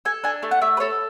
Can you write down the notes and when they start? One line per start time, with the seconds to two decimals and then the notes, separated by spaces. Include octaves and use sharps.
0.05 A4 G#5
0.24 D4 G#5
0.43 A3
0.51 F#5
0.61 A3 E5
0.77 B4
0.80 A4 C#5